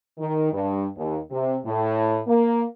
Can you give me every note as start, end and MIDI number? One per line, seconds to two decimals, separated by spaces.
0.19 0.52 51
0.53 0.87 43
0.97 1.18 39
1.31 1.57 48
1.65 2.20 45
2.28 2.65 58